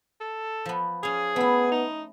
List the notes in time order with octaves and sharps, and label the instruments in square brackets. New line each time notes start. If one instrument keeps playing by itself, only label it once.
[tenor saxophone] A4
[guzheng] F3 B3
[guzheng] C#4 F5 [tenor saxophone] G#4
[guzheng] A3 E4 [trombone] B3
[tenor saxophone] D#4